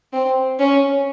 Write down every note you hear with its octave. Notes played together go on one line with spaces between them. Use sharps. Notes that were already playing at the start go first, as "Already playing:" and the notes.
C4
C#4